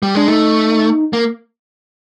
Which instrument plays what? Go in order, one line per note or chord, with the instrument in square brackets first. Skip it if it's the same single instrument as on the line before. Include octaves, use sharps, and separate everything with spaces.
[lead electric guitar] G3
[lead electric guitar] G#3 [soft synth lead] D4
[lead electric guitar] A3 [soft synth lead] D#4
[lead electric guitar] A#3